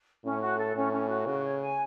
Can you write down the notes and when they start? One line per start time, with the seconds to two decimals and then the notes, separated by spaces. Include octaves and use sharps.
0.24 A2 C#4
0.41 F#4
0.58 A4
0.75 A2 C#4
0.92 C#4
1.09 F#4
1.26 C#3 F#4
1.44 C#5
1.62 G#5